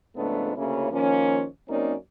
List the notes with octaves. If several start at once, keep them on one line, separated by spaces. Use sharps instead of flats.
F2 G#2 C#3 A3 B3 D4
D2 C#3 A#3 C#4 E4
D#3 F3 A#3 C#4
F#2 A#3 C4 C#4 D#4 D5